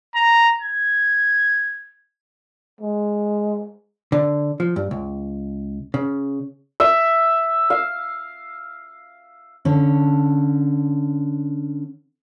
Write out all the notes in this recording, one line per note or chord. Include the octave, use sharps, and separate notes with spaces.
A#5
G#6
G#3
D3
F3
G2
C#2
C#3
E5
F5
D3 C#4